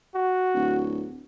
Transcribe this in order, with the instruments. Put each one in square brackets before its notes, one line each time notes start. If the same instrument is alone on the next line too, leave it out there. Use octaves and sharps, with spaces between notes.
[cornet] F#4
[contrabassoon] D1